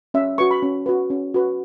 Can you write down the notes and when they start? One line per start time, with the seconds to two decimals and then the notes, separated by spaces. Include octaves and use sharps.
0.14 C#4 E5
0.38 F#4 B4 C#6
0.51 B5
0.62 C#4
0.86 F#4 B4
1.10 C#4
1.34 F#4 B4